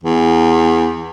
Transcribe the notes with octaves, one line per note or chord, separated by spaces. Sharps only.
E2